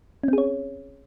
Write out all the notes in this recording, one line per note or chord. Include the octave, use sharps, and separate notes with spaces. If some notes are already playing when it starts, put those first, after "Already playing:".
C4 C#4 G#4 C#5